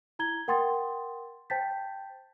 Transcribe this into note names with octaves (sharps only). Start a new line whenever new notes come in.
E4 A#5 G#6 G7
A#4 F#5 G5 C6 D#6 A6
C5 G5 A5 G6 A6 B6